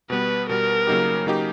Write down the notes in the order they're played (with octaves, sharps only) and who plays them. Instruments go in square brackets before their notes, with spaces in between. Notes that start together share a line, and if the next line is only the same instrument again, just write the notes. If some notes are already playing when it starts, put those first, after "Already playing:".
[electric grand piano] B2 G3 B3 [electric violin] B4
[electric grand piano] B2 G3 B3 [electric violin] A#4
[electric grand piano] C#3 F#3 A#3 D#4 G4
C#3 F#3 A#3 D#4 G4